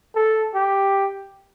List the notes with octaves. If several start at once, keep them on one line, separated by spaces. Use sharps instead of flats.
A4
G4